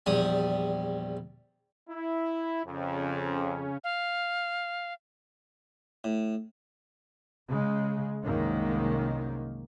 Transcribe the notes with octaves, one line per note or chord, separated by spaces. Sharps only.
A#1 E2 G3 D#6
E4
F2 C#3 C#4
F5
A2
C#3 G#3
C2 F#2 D#3 G#3 A#3